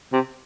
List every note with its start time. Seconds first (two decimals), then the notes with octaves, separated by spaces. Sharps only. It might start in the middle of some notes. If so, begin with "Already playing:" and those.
0.13 C3